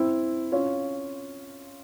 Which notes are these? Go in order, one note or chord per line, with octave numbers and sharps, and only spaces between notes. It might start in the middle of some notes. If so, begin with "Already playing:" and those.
Already playing: C4 E4
C#4 F4